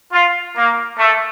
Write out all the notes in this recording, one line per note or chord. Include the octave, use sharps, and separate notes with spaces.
F4
A#3
A3